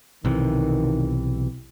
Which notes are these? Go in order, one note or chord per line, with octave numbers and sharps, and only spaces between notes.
B1 C3 D#3 E3